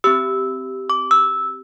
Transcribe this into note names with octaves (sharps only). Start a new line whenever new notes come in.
C4 G4 E6
D6
E6